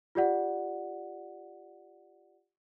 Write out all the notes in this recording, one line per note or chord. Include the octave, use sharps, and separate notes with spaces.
F4 G4 D5 F#5